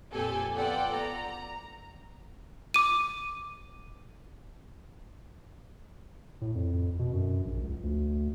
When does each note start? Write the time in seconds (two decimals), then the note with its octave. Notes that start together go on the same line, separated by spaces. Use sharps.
0.12 F2 A#2 G4 A4 G#5
0.56 B3 F4 A4 D5 F#5 G5
0.96 A#5
2.74 D6 D#7
6.41 A2
6.55 F2
6.99 B2
7.13 F#2
7.45 A#1
7.62 C#2
7.83 D2